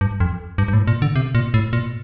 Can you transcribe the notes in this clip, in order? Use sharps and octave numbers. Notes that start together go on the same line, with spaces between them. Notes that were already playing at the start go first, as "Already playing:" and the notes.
G2
F2
G2
G2
A2
A#2
D3
C3
A#2
A2
A#2